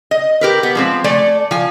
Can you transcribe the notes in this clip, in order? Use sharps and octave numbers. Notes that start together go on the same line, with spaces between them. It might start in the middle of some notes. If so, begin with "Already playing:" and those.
D#5
G4 A#4 B4
B3
F3 G#3 C4
A3 D5 G#5
F3 G#5